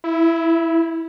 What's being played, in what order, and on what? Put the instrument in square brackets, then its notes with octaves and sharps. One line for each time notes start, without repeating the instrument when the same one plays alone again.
[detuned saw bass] E4